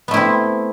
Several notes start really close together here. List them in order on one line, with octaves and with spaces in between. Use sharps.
B3 A3 E4 C4